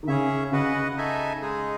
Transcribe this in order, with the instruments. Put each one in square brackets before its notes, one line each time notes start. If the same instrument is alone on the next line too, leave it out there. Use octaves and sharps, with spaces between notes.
[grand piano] D#3
[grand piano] C#3 [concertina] C#4 G#4 C#5 E5
[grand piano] C#3 [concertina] F#4 B4 D#5 F#5
[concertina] D#4 A4 E5 G#5
G#3 D#4 G#4